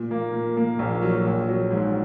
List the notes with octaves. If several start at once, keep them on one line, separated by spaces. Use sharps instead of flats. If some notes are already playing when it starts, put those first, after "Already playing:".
Already playing: A#2
A#3
A#2
A#3
A#1
F#3
A#1
F#3
G#2